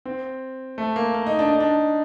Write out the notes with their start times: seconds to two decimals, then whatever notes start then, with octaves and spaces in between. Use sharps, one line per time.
0.05 C4
0.78 A3
0.96 A#3
1.14 A#3
1.26 D#4
1.39 D4
1.49 D#4
1.60 D4